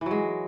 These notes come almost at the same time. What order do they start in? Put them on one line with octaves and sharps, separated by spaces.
E3 F#3 G#3